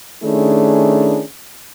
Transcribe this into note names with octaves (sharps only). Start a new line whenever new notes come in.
D#3 A3 C#4 D4 E4 G#4